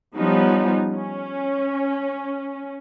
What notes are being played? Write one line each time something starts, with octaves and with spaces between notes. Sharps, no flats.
F3 G3 B3 C#4 D#4
C#4